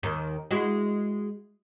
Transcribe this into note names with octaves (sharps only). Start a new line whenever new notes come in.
D#2 D#3
G#3 E4 F#4